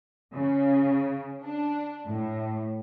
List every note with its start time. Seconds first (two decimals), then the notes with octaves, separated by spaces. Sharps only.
0.33 C#3
1.43 D4
2.07 A2